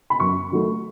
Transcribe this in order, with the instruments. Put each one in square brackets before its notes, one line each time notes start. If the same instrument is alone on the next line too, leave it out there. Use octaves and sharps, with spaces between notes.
[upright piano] B5
F#2 C#6
D#3 F#3 A3